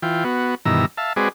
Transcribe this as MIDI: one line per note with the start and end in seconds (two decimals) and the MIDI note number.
0.02 0.24 52
0.02 0.24 65
0.02 0.24 79
0.24 0.55 59
0.24 0.55 66
0.65 0.86 43
0.65 0.86 47
0.65 0.86 51
0.65 0.86 52
0.65 0.86 82
0.65 0.86 88
0.97 1.13 76
0.97 1.13 77
0.97 1.13 81
1.16 1.29 56
1.16 1.29 60
1.16 1.29 66
1.16 1.29 68
1.16 1.29 71
1.16 1.29 74